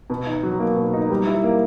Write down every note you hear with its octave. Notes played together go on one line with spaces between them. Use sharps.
B2
D#4
F#3
A#3
B2
D#4
G3
E4
A#3